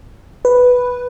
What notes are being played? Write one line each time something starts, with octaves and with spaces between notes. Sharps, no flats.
B4